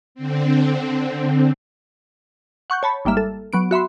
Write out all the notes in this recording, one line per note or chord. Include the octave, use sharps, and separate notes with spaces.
D3 C4
F#5 C#6 F#6 G6
C#5 A5 B5
G#1 G3 A#3 E5 F6
A4
F#3 B3 D7
F#4 E5 B5 C6